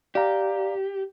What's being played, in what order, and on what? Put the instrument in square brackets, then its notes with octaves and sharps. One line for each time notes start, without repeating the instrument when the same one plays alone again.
[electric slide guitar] G4 [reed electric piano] D5 F5 A#5